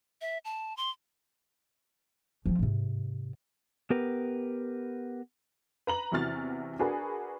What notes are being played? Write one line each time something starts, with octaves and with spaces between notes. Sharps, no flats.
E5
A5
C6
F3 C4
G#2 C3
B3 G4 A#4 B4
B4 A#5 F#7
E2 C3 E3 F#4 F6 A6
D4 F#4 G#4 A#4 B4